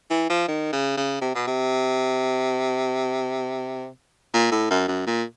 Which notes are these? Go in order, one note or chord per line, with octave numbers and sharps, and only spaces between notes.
E3
F3
D#3
C#3
C#3
C3
B2
C3
A#2
A2
F#2
F#2
A#2